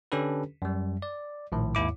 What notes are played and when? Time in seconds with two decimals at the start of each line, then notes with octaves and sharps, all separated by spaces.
0.12 D3 C#4 D4 G4 A4 B4
0.62 F#2 G3
1.02 D5
1.52 A#1 A2 D#3
1.75 D#2 G#2 E4 D6